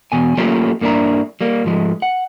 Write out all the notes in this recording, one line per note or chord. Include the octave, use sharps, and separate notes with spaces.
E2 B2 G#5
F#3 A3 A#3 C#4 F4 G4
G2 A#3 D4 E4 A#5
G3 A#3
G#2 F3 G#3 A3
F#5